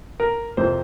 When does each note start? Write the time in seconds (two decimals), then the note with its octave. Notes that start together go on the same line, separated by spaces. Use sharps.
0.20 A#4
0.57 F2 C3 F3 A#3 C5